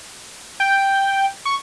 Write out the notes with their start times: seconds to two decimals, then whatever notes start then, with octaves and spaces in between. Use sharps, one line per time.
0.60 G5
1.45 C#6